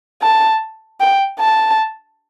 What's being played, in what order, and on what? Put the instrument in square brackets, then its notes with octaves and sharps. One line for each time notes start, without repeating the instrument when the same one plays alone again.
[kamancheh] A5
G5
A5